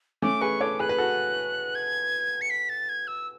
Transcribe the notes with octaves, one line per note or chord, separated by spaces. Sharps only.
A3 C#4 D6
G#4 B4 C#6
A4 C#5 D6
G#4 B4 F#6
B4
F#4 A4
G#6
C#7
B6
A6
G#6
E6